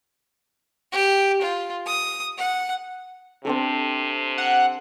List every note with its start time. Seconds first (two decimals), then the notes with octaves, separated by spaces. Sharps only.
0.92 G4
1.42 F4
1.86 D#6
2.38 F#5
3.45 C3 C4 D4 A4
4.38 F#5